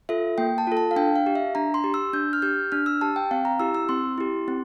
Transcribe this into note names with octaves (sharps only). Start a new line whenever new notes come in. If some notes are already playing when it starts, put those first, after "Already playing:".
F4 A4 E5
A#3 G5
A5
F4 A4
A5
F5
D4 G5
F5
G4
E5
D4 A#5
C6
G4
E6
D4 G6
F6
G4 G6
D4 F6
E6
G4 A5
G5
C4 F5
A#5
E4 G4 E6
E6
C4 C6
E4 G4
C4